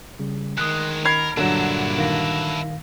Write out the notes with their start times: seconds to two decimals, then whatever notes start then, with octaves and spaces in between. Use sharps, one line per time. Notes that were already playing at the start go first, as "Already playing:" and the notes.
0.19 C#3 G3
0.58 D2 D#3 G#3 D#6 F#6
1.05 C#2 A#4 B5 G#6 C7
1.37 G2 A#2 D3 F#3 D4 E4
1.98 D#3 F5 A#6